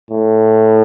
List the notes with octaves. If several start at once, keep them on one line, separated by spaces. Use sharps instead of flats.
A2